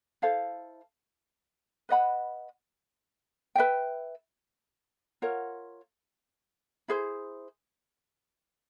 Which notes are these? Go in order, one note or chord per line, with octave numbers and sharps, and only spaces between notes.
E4 A4 C5 F5
B4 D#5 F#5 B5
B4 E5 G5
F4 A#4 C#5 F#5
E4 G#4 C5